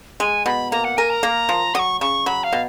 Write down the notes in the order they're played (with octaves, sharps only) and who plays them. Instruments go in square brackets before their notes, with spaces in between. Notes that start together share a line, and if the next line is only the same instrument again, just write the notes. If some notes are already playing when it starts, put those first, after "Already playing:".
[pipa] G#3 [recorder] G#5
[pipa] B2 [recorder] B5
[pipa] A#3 [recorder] A#5
[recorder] F#5
[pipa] A#4 [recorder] G#5
[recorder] A#5
[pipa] A#3
F3
[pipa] F#3 [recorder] C#6 D#6
[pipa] C#3 [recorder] C#6
[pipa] F#3 [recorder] B5
[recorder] F5
[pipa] B2